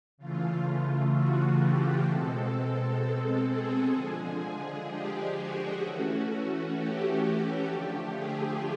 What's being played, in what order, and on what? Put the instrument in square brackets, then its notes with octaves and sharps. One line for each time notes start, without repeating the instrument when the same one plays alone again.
[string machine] C#3 E3 A3 F4
F4
F#4
G4
B2 G#3 C4 A4
A4
G#4
D3 F3 G#3
G4
F#4
E3 A3 C#4 F#4
G4
D3 F3 A3
G#4